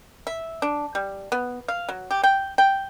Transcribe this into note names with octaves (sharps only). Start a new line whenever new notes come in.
E5
D4
G3
B3
F5
F#3
G4
G5
G5